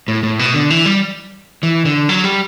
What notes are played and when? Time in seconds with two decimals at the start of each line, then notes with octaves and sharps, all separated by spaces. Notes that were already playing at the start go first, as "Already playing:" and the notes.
0.08 A2
0.23 A2
0.39 B2
0.54 D3
0.70 E3
0.85 G3
1.63 E3
1.85 D3
2.09 F#3
2.24 G3